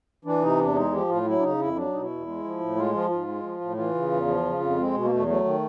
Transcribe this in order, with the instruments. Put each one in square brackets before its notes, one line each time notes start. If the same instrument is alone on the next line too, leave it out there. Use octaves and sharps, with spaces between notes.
[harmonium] E3 D4
C3 D#4
E2 D4
G#3 D#4
F3 G4
A2 F4
F#3 E4
D4
C#3 D#4
F2 E4
F#3 D4
B2 D#4
E4
E2
G#3
F3
A2
G#3 F4
F3 F4
G#2 F4
G#3
F3
A2
E3 F4
C#3
E2
F3
C#3
F2
G#3 C4
B2
A#3
E2 A3
F#3 A3
D#3